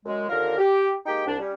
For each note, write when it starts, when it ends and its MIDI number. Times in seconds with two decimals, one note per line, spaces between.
0.06 0.27 42
0.06 0.27 56
0.29 0.57 39
0.29 0.57 50
0.29 0.57 65
0.29 0.57 70
0.58 0.92 67
1.06 1.23 56
1.06 1.23 58
1.06 1.23 63
1.06 1.23 67
1.06 1.23 79
1.27 1.38 36
1.27 1.38 62
1.39 1.53 55
1.39 1.53 61